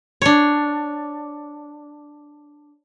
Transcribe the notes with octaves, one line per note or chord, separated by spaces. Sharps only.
D4 C#5